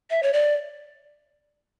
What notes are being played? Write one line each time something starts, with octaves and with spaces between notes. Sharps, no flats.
E5
C#5
D5